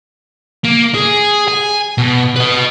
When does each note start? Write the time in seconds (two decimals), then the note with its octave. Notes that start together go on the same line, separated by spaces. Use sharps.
0.64 A#3
0.94 G#4
1.48 G#5
1.98 B2
2.36 B4 D#5